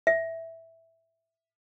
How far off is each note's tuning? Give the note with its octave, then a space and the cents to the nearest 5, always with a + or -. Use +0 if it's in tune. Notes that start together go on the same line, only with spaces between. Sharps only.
E5 -5